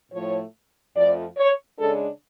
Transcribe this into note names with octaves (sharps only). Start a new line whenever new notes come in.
A2 F3 A3 C#5
F2 F3 A3 D5
C#5
C#3 G#3 D4 A4